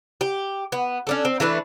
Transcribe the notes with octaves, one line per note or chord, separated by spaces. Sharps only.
G4
B3
C#4 D4 A4
C4
E3 A3 D4 B4